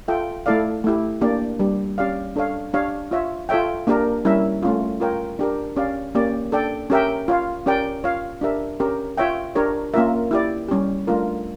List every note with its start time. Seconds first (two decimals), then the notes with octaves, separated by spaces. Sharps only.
0.08 F4 A4 E5 G5
0.46 A3 E4 A4 D5 F5
0.84 A3 E4 G4
1.21 A#3 D4 G4 D5
1.59 G3 D4 G4
1.98 C#4 G4 D5 F5
2.36 D4 A4 C#5 F5
2.74 D4 G4 C#5 F5
3.11 F4 C#5 E5
3.49 F4 A4 C#5 E5 G5
3.87 A#3 D4 G4 A#4
4.25 G3 C#4 E4 A#4 E5
4.63 A3 C#4 F4
5.00 F4 A#4 C#5 G5
5.39 D4 G4 A#4
5.76 C#4 G4 D5 F5
6.15 A#3 C#4 G4 D5
6.52 D4 A4 D5 G5
6.90 C#4 G4 A#4 E5 G5
7.28 F4 C#5 F5
7.66 C#4 G4 A#4 D5 G5
8.04 F4 C#5 F5
8.41 D4 G4 A#4 E5
8.80 C#4 G4 A#4
9.18 F4 C#5 E5 G5
9.55 D4 G4 A#4 C#5
9.94 A#3 C#4 F4 A#4 E5
10.31 E4 G4 D5
10.69 G3 C#4 G4
11.07 A3 D4 F4 A#4